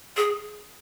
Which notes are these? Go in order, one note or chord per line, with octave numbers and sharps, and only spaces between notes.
G#4